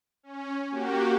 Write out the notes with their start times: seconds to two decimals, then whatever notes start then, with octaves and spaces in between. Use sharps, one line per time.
0.23 C#4
0.71 A#3 F#4 G4